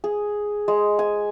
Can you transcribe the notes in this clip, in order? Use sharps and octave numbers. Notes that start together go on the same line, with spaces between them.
G#4
G#3
G#5